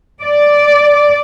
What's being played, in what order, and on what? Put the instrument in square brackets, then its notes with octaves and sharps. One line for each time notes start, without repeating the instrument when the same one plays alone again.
[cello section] D5